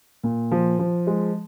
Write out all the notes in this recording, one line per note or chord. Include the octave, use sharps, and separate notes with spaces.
A#2
F3
F3
G#3